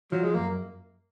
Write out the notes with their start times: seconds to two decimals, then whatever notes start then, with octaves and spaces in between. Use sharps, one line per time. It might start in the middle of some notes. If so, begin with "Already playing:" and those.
0.12 F3 F#3
0.24 G#3
0.35 F#2 A#3